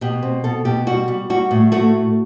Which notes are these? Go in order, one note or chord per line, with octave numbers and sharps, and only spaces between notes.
B2 G4
C4
B2 A4
B2 G4
G3 F#4
G3
G3 F#4
A2
A3 F#4